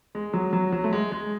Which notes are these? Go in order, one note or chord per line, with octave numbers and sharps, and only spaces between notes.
G#3
F#3
F#3
F#3
A3
G#3
G#3